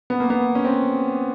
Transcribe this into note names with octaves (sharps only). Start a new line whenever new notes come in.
B3
A#3
B3
C#4
C4